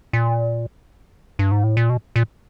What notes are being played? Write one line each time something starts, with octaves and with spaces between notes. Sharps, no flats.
A#2
G2
G#2
A2
A#2
B2
A#2